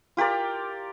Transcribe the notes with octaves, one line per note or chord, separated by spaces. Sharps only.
F4 G4 A#4 D5